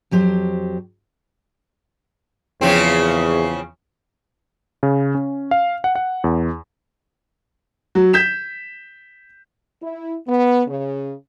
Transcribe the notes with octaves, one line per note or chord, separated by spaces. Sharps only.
F2 F#3 G4 C5
E2 C#3 F3 C4
C#3
C#4
F5
F#5
F#5
E2
F#3
G6 B6 E7
E4
B3
C#3